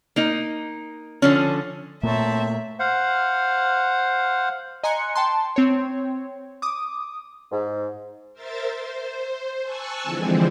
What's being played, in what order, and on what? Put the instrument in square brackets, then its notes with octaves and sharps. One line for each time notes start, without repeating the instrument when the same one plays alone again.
[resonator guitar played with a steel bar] A#3 D#4 D#5
D3 F3 C#4
[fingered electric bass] A#2 A3 A#3 [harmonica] C4 C#5 A5 [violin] E5
[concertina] C5 F5 F#5
[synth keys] D#5 G#5 A#5 C6 F#6 C#7
G5 A5 C6
C4 C#5
D6 D#6
[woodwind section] G#2
[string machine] A#4 C5 E5 A6
C5
G#5 A5 C#6 E6 F#6 G#6
D3 E3 F3 G#3 C4